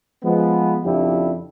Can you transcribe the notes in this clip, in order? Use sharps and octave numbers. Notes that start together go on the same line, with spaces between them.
F3 G#3 B3
F2 C#3 F3 D4 E4 G4